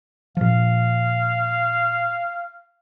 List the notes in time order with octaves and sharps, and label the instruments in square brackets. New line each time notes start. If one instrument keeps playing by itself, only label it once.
[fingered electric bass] A#2 F3 [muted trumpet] F5